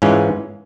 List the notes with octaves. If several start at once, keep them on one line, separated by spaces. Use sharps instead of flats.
G#2 E3 G#3 C#4 F4